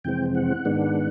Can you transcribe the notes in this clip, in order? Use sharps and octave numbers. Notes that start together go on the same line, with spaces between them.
F2 C3 E3 G#3 C4 G5
F#5
G#2 D#3 G#3 B3 D4